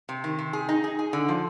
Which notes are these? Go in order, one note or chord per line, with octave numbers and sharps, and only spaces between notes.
C3
D#3
C3
G#4
D#4
G#4
G#4
D3
F3